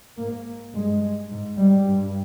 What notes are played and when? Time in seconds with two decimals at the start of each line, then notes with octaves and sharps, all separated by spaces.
0.17 G#2 A#3
0.74 G2 G#3
1.30 G#2
1.58 G3
1.87 G2